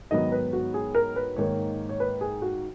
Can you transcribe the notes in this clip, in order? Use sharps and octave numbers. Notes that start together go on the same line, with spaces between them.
G#2 D#3 F#3 B3 D#5
B4
F#4
G#4
A#4
B4
G#2 D#3 A#3 C#5
C#5
B4
G#4
F#4